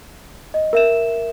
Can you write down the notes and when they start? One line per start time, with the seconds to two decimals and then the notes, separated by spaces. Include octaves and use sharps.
0.54 D#5
0.73 A#4 E5 E7